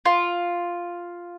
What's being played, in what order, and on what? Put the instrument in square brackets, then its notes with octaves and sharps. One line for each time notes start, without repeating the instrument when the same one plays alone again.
[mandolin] F4